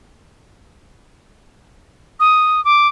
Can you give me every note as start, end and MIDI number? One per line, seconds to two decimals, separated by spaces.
2.20 2.63 87
2.65 2.88 86